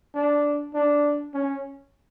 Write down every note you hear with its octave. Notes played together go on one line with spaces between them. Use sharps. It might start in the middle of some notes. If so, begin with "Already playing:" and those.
D4
D4
C#4